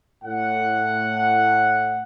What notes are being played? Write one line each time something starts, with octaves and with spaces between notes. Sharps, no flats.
A2 F#5